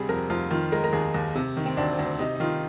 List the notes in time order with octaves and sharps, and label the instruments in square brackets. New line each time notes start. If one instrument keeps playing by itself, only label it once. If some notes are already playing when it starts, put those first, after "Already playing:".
Already playing: [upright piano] D2 C3 G3 G#4
F2 A#4
F2 F4
D#3 F4
G#3 A#4
A#4
D#2 G#4
D#2
C3
D#3
C4
D2 D4
D2
C3 D#4
D#4
D#3 F4